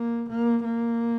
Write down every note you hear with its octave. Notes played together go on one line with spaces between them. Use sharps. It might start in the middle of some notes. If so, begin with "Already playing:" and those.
Already playing: A#3
A#3
A#3